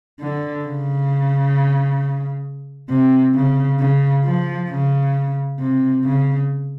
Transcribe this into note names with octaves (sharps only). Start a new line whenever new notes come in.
D3
C#3
C3
C#3
C#3
F3
C#3
C3
C#3